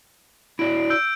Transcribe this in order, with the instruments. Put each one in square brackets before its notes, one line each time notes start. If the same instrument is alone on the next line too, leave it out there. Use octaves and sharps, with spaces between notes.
[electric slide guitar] E4 F#4 D5 [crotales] D7
[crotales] E6 G6 D7